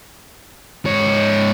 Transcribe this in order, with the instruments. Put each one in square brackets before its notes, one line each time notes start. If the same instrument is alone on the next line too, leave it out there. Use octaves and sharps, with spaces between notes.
[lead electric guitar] G#2 C#5